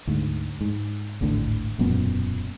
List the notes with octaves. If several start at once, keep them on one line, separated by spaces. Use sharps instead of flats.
D2 G#2
G#2
G#1 D2 A2 D3
E1 F#2 A#2 B3